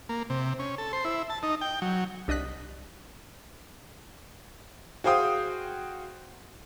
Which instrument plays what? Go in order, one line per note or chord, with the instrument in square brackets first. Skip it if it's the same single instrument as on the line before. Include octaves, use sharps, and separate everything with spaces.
[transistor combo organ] A#3
C3
C#4
A4
C5
E4
A5
D#4
G5
F#3
[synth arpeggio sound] C2 D4 D#5 D#6 F#6 B6
[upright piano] F#4 G#4 C5 F5 G5 D#6